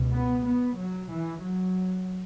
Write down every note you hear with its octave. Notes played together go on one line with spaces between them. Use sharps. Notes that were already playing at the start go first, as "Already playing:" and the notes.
Already playing: C#2 B2
B3
B3
F#3
E3
F#3